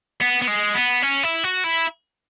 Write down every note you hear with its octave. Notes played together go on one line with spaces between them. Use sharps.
B3
B3
G#3
B3
C#4
E4
F#4
E4